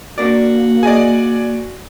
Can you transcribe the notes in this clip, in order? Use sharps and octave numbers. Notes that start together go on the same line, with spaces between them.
A#3 D4 F#4 A#4 D5
G#4 D5 D#5 G#5